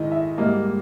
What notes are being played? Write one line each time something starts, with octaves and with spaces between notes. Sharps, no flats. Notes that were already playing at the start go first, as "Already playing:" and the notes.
Already playing: G#2 D#3 G#3 E4 D#5
E5
G#2 G3 A#3 D#5